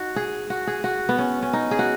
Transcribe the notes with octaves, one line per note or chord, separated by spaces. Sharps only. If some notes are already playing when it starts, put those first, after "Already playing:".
Already playing: D#4 F#4
G#4
F#4
G#4
F#4
B3
C#4
C#4
D#4
G#4
F#4